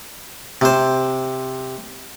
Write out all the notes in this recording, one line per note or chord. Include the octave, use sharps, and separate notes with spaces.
C3 C5